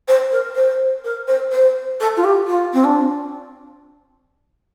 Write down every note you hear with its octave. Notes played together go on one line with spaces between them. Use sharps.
C5
A#4
C5
A#4
C5
C5
A4
F4
G4
F4
C4
D4